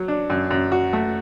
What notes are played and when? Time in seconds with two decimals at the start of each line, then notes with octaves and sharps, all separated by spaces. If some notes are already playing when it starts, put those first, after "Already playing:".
Already playing: F#3
0.08 D4
0.30 F#2
0.51 F#2
0.72 F#4
0.93 A3